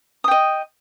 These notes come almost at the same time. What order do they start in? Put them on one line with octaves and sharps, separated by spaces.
D#6 G5 D#5